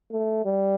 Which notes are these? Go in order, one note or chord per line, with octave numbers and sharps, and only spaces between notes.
A3
G3